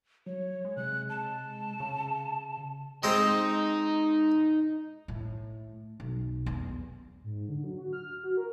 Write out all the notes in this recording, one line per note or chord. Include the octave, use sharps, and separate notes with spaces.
F#3 C#5
G#3
C3 F#6
A5
C#3
G#3 C4 D#4
A2
B1
E2
G#2
D3
F#3
F#4
F6
F#4
A#4